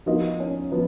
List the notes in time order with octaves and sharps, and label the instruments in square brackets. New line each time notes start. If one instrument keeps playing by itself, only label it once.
[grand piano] F3 B3 F4 A#4 D#5 [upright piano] D#4
[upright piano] C#4
[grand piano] F3 [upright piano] B3